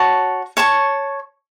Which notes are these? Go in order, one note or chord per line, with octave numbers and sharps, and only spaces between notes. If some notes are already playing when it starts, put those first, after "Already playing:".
Already playing: F#4 C#5 A5
C#5 A5 C#6